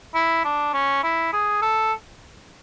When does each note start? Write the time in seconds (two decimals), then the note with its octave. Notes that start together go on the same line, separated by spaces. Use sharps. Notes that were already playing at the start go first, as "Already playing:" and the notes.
0.14 E4
0.45 D4
0.73 C#4
1.03 E4
1.33 G#4
1.62 A4